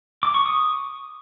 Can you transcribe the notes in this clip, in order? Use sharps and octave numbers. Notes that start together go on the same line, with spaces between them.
D6
C#6
D#6